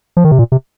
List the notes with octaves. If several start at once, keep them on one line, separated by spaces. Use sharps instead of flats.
F3
D#3
C3
A#2
C3